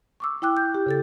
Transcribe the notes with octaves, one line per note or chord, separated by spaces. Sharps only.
C#6 D6 E6
E4 G5 D6 F#6
G6
G4
C#3 A4 A6